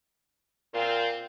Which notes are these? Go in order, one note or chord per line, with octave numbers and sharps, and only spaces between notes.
A#2 C4 F4